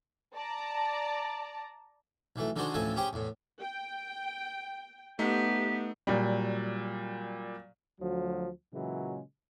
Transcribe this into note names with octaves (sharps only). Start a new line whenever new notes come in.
D5 A5 A#5
B1 E3 A3
D3 D#3 G#3 D4 F#4 C5
A1 D2 F3 C4 A4 G#5
C#4 G4 G#4 C5 G5
E2 A2
G5
A3 B3 D#4 G4 B6
A#2 F#3 G3
D2 F3 F#3
A#2 C#3 E3 F#3 G#3